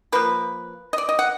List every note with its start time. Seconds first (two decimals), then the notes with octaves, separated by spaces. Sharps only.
0.12 F3 A#3 B4
0.93 D#5
0.98 D5
1.09 D#5
1.19 F#5